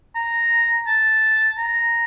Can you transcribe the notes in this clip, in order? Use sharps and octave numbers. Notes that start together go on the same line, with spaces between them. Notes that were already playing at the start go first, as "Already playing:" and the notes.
A#5
A5
A#5